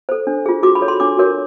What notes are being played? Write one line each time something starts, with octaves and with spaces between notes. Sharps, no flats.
A4 C5
D4
F4 G#4
F#4 D6
B5
A4 C#5
C6
D4 D6
F#4 A#4 C#5